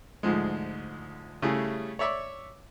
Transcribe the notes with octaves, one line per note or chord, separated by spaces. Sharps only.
D2 G#2 F3 G#3
C#3 G3 A3 E4 G#4
C#5 D5 E5 C#6 D6